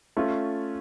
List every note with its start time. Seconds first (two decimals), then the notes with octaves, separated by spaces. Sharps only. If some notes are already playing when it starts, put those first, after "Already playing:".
0.17 A3 C#4 F4